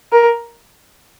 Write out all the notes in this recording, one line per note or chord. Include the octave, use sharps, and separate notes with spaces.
A#4